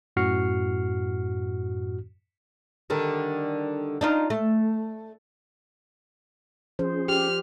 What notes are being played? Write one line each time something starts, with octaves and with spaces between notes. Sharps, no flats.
F#2 A2 F#4 F6 C7 C#7
D3 D#3 G3
D4 D#4 F4
A3
F3 C#4 G#4 C5
G4 F6